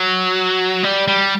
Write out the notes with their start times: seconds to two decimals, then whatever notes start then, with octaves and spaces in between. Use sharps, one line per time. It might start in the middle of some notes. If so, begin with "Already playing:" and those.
Already playing: F#3
0.83 G3
1.08 G3